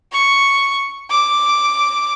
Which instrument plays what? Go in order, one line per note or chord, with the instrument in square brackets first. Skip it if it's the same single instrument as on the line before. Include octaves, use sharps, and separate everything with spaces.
[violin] C#6
D6